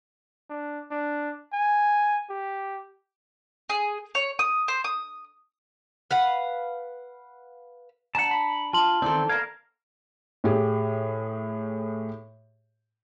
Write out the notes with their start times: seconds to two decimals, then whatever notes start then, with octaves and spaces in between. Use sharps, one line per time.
0.50 D4
0.91 D4
1.53 G#5
2.30 G4
3.70 G#4
4.15 C#5
4.39 D#6
4.68 C5
4.84 D#6
6.11 B4 F5 F#5
8.15 D4 F#5 A5 A#5 C#7
8.31 B5
8.73 F4 A5 C6 F#7
9.02 D#3 E3 C4 A4 D5
9.29 A#3 B3 A#4 D5 F5 G#6
10.44 A2 G4 G#4